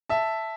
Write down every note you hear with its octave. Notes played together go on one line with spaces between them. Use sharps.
E5 A5